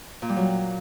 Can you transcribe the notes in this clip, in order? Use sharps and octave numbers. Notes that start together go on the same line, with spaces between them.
A#2
G3
F#3